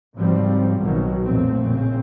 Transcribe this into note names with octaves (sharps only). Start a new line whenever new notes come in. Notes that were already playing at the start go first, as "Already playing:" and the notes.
G#1 C#3 F3 G3 C4
B1 B2 D#3 F#3
F2 A#2 A3 C4
A#1 C#3 C4